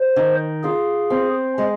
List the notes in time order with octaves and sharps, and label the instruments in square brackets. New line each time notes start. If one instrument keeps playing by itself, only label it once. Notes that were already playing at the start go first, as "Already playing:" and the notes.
Already playing: [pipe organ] C5
[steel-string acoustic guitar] D#3
[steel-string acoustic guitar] F4 [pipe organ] G#4
[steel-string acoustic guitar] C4
G#3